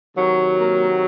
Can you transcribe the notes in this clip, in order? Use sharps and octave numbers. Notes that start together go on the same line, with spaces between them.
C3 D#3 F#3
A#3